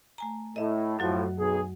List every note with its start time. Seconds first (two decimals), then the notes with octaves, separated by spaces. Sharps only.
0.18 A3 G#5 A#5
0.56 A2 D#5 E5
0.99 F#2 A2 F3 F#3 F#4
1.38 B1 G#4